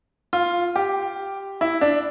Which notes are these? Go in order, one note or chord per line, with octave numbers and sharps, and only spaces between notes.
F4
G4
E4
D4